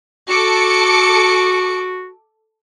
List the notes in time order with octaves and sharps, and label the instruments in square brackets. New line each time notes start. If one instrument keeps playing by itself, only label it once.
[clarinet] F#4 [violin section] A4 D6 C#7